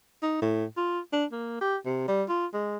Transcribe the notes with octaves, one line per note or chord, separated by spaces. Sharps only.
D#4
A2
F4
D4
A#3
G4
C3
G3
F4
G#3